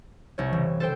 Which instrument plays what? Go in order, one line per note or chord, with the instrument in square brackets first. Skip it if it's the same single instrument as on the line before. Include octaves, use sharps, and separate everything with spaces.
[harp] C2 C#5
[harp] F#1 [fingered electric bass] E3
[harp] A4 C5 G5